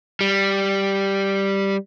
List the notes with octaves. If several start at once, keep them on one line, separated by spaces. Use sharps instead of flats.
G3